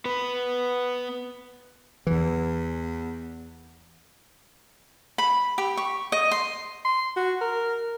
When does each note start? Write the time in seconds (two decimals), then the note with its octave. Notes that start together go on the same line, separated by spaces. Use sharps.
0.05 B3 B4
2.07 E2 E3
5.18 B5
5.58 G4
5.77 C#6
6.12 D#5
6.31 C6
6.85 C6
7.16 F#4
7.41 A#4